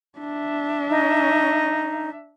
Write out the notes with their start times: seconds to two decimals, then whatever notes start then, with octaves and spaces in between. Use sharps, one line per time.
0.19 D4 E5
0.90 D#4